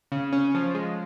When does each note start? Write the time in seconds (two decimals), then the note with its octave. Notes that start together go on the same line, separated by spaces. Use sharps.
0.12 C#3
0.33 C#4
0.55 F3
0.74 G#3